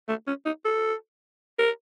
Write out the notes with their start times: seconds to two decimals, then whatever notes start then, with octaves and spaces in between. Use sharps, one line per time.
0.08 A3
0.27 C#4
0.45 D#4
0.65 A4
1.59 A#4